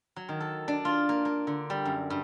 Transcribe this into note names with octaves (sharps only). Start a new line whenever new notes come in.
F#3
D#3
A4
D4
F4
A#3
A#3
D3
G3
F#2
G2